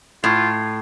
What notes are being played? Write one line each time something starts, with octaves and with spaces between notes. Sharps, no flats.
A2 F4